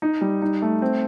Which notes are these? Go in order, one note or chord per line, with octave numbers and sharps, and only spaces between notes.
D#4
G3
D#4
A3
C4